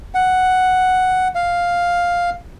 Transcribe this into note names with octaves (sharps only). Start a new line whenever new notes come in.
F#5
F5